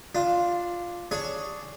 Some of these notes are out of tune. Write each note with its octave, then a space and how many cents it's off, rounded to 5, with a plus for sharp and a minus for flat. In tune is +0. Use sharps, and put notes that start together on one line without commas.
D4 +0 F4 +0
D4 +0 G#4 +5 C#5 +0